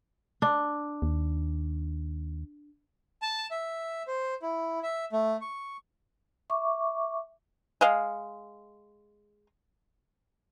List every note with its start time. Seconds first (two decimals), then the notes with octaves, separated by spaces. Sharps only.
0.42 D4
1.02 D#2
3.22 A5
3.51 E5
4.07 C5
4.42 E4
4.83 E5
5.13 A3
5.41 C#6
6.50 E5 C#6 D6
7.81 G#3 D#5 F5